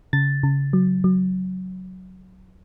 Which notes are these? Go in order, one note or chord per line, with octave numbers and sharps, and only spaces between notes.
C#3 A6
C#3
F#3
F#3